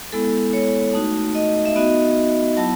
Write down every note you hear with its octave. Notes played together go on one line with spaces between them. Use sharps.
G#3 B3 E4 A4
C#5
A3 D#4 F#4
D#5
E5
B3 D#4 F#4 D#5
F#3 B3 E4 A5